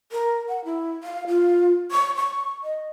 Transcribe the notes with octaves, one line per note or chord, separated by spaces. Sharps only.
A#4
F#5
E4
F5
F4
C#6
C#6
D#5